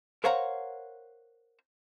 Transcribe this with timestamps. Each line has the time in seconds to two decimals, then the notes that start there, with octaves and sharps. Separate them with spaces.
0.24 A#4 C5 C#5 F5 F#5 A#5